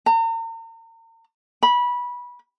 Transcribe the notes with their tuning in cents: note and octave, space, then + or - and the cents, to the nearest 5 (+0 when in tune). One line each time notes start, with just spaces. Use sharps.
A#5 -40
B5 -20